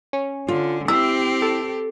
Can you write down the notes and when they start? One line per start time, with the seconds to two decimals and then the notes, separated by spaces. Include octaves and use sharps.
0.13 C#4
0.48 D3 F4
0.88 C4 E4 G4 E5 E6
1.42 A4